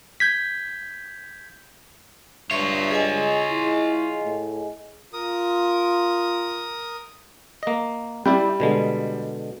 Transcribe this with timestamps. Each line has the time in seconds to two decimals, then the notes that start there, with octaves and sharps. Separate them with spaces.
0.20 G6 G#6 B6
2.51 G2 F4 C#5 E5 C#6
2.91 G#4 D#5 G#5
3.50 E4
4.25 A2
5.13 F4 A#4 D#6
7.63 A#3 D#5
8.26 G3 E4 D5 G5
8.60 B2 D3 G#3